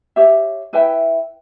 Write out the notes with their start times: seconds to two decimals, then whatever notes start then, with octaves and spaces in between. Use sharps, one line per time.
0.16 G4 C#5 E5
0.73 E4 B4 E5 G5